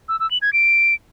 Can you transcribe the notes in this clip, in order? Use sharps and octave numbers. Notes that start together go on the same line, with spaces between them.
E6
E6
F#7
G#6
D7